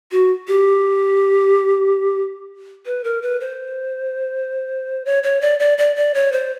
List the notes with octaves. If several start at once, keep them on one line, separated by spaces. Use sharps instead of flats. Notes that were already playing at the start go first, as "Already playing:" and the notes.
F#4
G4
B4
A#4
B4
C5
C#5
C#5
D5
D5
D5
D5
C#5
C5